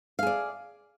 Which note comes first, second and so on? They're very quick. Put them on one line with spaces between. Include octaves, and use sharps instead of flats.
F5 G#4 D5